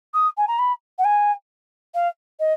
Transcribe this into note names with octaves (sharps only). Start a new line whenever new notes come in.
D#6
G#5
A#5
B5
F#5
G#5
F5
D#5